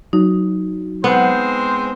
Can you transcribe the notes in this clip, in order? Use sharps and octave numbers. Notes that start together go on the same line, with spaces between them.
F#3 D#4
G#3 B3 C4 C5